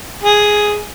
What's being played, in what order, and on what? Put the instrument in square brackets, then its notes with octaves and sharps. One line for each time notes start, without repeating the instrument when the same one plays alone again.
[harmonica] G#4